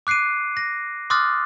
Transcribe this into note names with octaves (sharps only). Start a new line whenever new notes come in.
D6 F#6 C7 D7 D#7
A#6
C6 D6 D#6 F6 F#6 A6